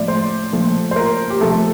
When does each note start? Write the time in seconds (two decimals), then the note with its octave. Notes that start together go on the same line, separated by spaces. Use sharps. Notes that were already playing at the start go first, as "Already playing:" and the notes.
Already playing: A2 F3 A3 D5 E5
0.08 C5
0.53 A#2 F3 A3
0.91 C5
0.96 A#4
1.30 G4
1.41 C3 F3 A3 A4